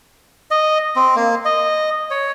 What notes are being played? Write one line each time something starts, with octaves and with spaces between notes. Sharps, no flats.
D#5
C4
A#3
D#5
C#5